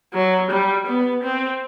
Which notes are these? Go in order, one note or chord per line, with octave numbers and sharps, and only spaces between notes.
F#3
G3
B3
C4